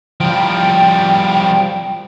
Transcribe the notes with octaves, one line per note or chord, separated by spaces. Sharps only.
F3 G3 G5